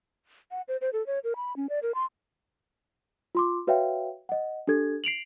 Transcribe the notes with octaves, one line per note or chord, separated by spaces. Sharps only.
F#5
C5
C5
A4
C#5
A#4
B5
C#4
D5
A#4
C6
F4 C6 D6
F#4 B4 C#5 E5 F5 G5
D#5 F#5
D4 G4 A4 G#6
C7 D7 F7 F#7